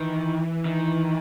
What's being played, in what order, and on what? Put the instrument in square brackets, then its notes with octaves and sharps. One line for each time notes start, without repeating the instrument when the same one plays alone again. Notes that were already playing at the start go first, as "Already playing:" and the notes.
Already playing: [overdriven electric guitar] D#3 [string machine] E3
[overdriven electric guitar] D#3